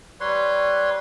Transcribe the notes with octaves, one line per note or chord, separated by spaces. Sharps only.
G3 B4 C#5 C6